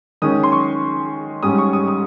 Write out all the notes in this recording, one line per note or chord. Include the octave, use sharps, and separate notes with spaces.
D#3 G#3 C#4 D#6
C6
C#6
G#2 G3 C#4 D#6
C#6
D#6
D#6